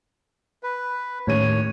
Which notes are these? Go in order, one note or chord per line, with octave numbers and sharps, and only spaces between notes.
B4
D#2 A2 C#4 C#5 D#7